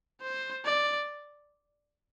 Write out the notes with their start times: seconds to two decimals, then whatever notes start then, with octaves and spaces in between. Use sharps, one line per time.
0.22 C5
0.65 D5